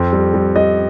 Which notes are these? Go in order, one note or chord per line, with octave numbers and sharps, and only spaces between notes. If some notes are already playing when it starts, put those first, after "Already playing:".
Already playing: F2 C4
G3
G3
G3 D#5